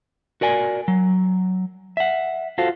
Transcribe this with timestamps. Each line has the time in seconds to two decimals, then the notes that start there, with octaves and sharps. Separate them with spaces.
0.41 F#4 A#4 D5 G#5
0.88 F#3
1.97 E5 F#5
2.58 F4 F#4 A4 C5 F5